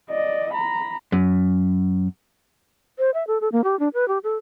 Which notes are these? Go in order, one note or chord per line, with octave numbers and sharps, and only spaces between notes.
D5 D#5
A#5 B5
F#2
C5
E5
A4
A4
A#3
G4
D4
B4
G4
A4